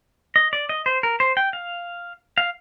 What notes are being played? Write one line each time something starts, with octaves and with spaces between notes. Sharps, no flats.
D#5
D5
D#5
C5
A#4
C5
G5
F5
F5